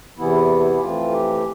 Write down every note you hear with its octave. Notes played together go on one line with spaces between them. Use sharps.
E2 C3 E3 B3 E4
E4
G4
F2 E3 A3 C4 F4
G4